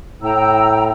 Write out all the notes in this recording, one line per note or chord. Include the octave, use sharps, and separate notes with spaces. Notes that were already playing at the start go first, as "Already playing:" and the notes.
A2 G5 A#5 E6